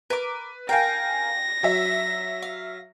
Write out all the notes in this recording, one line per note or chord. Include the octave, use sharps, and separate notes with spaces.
A#4 B4 D6
A#4 F5 G5 G#5 A#6
F#3 E5
F5